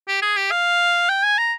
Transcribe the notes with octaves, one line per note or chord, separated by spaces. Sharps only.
G4
G#4
G4
F5
G5
G#5
A#5